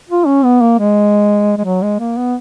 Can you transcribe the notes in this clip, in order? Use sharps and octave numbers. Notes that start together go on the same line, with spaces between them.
F4
C#4
B3
A#3
G#3
G#3
F#3
G#3
A#3
B3